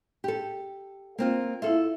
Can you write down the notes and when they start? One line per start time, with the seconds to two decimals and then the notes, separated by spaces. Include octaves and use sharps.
0.24 G4 A4
1.18 A#3 C4 F4
1.62 E4 F4 A4 E5